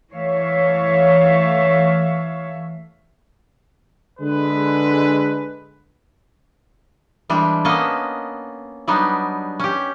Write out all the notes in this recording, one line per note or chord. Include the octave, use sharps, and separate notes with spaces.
E3 A3 C#5 E5 F5
D3 G#3 B4
E3 G3 G#3 D4
A#3 B3 C#4 A4 D#5 A5
F#3 G3 B3 D4 D#4
C#4 G4